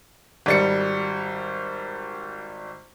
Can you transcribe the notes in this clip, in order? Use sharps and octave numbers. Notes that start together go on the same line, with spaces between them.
G#1 G3 C#7